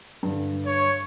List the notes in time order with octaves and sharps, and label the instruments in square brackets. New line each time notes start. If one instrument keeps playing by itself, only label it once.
[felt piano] G2 D3
[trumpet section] C#5